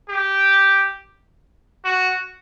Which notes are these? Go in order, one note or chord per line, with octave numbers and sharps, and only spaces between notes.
G4
F#4